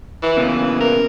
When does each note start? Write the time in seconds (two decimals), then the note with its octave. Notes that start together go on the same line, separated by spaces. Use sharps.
0.22 E3
0.37 C#3 A#3 B3
0.80 A#4